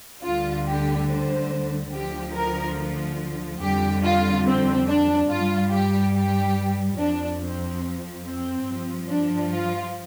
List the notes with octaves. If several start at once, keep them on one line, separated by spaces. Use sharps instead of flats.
D2 D3 G3 F4
G4
C5
D2 D3 F3 G4
A#4
F2 D3 G3 G4
F4
C4
D4
G2 G3 F4
G4
G4
F2 F3 D4
C4
C4
G2 F3
D4
F4